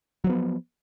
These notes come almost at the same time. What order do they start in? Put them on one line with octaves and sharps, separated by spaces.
F#3 F3 B3